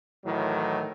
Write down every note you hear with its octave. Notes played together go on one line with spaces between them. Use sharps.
A2 D#3 E3 F#3